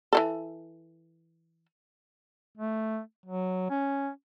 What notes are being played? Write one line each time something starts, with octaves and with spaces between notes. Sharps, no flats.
E3 G3 A4
A3
F#3
C#4